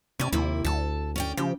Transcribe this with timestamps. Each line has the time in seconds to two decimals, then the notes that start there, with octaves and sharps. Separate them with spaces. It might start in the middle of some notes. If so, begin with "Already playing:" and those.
0.20 C3 C#4 D5
0.33 D#2 C3 A#3 E4
0.65 D2 A4 A5
1.16 C#4 D5 G5
1.37 C#3 F3 G4